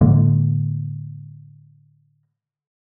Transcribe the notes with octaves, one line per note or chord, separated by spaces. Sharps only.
A2 D3 G#3 A#3